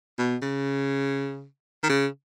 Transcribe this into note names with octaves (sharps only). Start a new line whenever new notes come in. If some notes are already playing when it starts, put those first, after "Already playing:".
B2
C#3
D#3
C#3